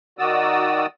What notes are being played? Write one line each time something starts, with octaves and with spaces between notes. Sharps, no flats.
D#3 F#4 D5 D#6 E6